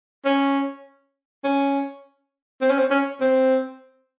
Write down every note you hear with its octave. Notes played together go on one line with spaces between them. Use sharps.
C#4
C#4
C4
C#4
C4
C#4
C4